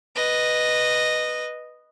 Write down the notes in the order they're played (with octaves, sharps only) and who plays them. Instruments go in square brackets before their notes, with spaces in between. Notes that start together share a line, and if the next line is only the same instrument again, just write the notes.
[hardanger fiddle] B4 D#5